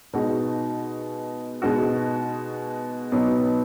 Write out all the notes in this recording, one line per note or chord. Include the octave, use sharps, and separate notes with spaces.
B2 G#3 D#4 F#4
B2 G#3 D#4 F#4
B2 F#3 B3 D#4